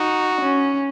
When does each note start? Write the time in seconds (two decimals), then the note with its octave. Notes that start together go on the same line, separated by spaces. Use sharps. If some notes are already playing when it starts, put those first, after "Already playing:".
Already playing: D#4 F#4
0.41 C#4